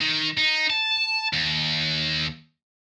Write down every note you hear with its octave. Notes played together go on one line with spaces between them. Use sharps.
D#3
D#4
A5
D#2